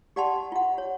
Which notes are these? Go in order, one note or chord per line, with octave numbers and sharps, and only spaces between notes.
G4 D5 F#5 G5 A5 C6
F4 F#5
C#5